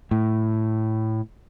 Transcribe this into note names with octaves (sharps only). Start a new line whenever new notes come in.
A2